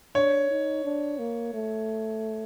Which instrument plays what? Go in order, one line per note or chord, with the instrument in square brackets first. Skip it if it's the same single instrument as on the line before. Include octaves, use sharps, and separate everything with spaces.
[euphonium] D4 [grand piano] C#5
[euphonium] D#4
D4
A#3
A3